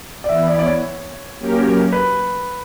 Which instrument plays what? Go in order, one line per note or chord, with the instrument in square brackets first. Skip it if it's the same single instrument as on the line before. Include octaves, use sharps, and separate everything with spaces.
[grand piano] D5
[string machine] E3 B3 E4 [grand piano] E5
[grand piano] D5
D5
C#5
[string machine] F#3 A#3 C#4 G4 A#4
[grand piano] B4